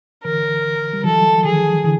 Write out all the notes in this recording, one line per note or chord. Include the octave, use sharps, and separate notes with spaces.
D3 E3 A#4
G3
E3 F#3 A4
D#3 F3 G#4
D3 E3